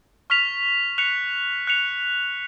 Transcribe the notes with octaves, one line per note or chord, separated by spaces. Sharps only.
C#6 F6 B6 F7
F#6 C#7 F7
F#6 C#7 F7